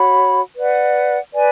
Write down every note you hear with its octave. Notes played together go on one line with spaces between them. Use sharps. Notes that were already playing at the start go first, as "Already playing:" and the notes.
Already playing: F#4 C#5 F#5 B5
B4 D5 F#5
B4 D5 G#5